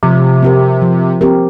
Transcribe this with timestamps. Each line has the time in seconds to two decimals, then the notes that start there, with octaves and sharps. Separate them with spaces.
0.03 C3 F3
0.43 C4 G4 A#4
0.82 F3
1.21 C4 G4 A#4